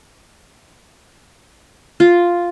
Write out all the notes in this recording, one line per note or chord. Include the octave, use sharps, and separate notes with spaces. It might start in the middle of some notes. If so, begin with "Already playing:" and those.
F4